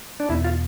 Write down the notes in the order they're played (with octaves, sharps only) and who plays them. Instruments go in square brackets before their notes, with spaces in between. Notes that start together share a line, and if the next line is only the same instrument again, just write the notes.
[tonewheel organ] D4
[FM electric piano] E2 B2 B3 [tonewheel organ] E4
[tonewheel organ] F4